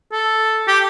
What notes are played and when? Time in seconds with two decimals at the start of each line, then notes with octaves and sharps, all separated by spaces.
0.12 A4
0.68 G4